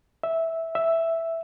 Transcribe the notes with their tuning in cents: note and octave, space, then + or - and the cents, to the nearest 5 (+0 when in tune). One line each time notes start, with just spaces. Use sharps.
E5 -10
E5 +0